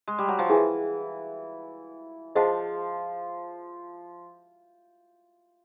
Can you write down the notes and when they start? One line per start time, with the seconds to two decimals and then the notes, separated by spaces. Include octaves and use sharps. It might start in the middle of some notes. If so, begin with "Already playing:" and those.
0.08 G#3
0.19 G3
0.28 F#3
0.39 F3
0.49 E3 E4 G#4 B4 E5 G#5
2.35 F3 G#4 C5 D#5 F#5 A5